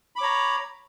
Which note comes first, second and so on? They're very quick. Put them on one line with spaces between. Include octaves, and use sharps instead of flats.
B5 D6 C#5 A#5